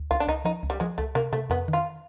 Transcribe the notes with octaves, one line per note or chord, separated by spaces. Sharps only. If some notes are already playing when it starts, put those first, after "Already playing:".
Already playing: D2
C#2 F4
D4
C#2 D#4
F3 D#4
C#2
G3
F3 G#3
C#2 A3
C3 A#3
C3 A3
F2 B3
D#3
F4